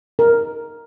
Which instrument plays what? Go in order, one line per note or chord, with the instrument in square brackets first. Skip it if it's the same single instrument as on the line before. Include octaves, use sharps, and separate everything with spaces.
[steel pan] A#4